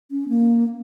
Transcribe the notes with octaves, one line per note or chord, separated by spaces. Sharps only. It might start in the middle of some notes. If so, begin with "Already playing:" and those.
C#4
A#3